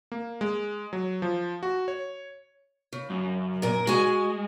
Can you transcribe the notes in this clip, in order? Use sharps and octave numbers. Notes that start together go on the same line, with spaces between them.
A#3
G#3
F#3
F3
F#4
C#5
C#3
F#2
A#2 A#4
G#3 F#4 G#5